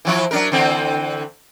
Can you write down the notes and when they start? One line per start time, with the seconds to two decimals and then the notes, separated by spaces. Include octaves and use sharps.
0.05 E3 F3 E4
0.31 F#3 D4 A#4
0.52 D3 E3 C4